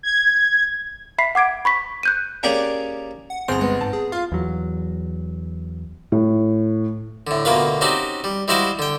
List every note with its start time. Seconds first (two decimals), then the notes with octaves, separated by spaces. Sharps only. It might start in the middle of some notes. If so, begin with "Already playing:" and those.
0.03 G#6
1.18 E5 B5 B6 C7
1.35 F#5 D6 G#6 D7
1.65 B5 C#6 B6
2.03 F#6 G6 D#7
2.43 A#3 C#4 G4 G#4 A#4 D5
3.30 F#5
3.48 G1 C4 G#4 A#5 C6
3.61 G#3 B3
3.81 G#2 A5
3.93 G#4
4.12 F4 F5
4.32 E2 F#3
6.12 A2
7.27 A2 D3
7.45 D2 B2 A#3 F4 B4
7.81 C4 C#4 D#4 F#4 G4
8.24 G3
8.48 G3 G#3 E4 F#4 C5 F5
8.79 D3 G5